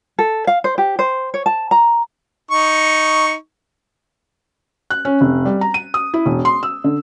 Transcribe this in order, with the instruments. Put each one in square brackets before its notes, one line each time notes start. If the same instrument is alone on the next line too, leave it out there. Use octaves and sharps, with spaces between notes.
[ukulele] A4
F5
C5
G4
C5
C#5
A5
A#5
[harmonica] D#4 C#6
[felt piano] F#6
C#4
F1
G3
A#5
D#7
D#6
E4
E1
C6
E6
D3